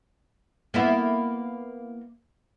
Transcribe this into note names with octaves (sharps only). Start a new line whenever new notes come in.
A#3 B3 E4